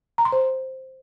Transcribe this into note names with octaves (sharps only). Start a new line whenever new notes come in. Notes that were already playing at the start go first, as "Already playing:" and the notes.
A#5
C6
C5